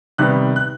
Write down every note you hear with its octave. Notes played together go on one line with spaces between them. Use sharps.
C3 D#3 G3 B3 F#6
F#6